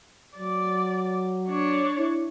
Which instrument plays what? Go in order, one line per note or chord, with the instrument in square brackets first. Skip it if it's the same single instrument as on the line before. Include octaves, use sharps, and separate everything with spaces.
[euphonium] F#3 [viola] D5
[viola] D4 C#5
[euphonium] E4